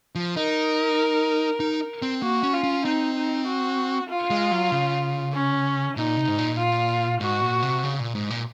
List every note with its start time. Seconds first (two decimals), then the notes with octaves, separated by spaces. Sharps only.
0.15 F3
0.35 D#4 A#4
1.60 D#4
2.02 C4
2.22 A#3 F#4
2.43 C#4
2.53 F4
2.64 C#4
2.85 C4 D#4
3.16 D#4
3.47 F#4
4.10 F4
4.30 G#3
4.52 F#3
4.72 C#3
5.34 C#4
5.97 A#2 D#4
6.17 C3
6.28 G#2
6.38 A#2
6.58 F4
7.20 G#2 F#4
7.42 A#2
7.62 C3
7.83 C#3
7.99 A#2
8.15 G#2
8.30 A#2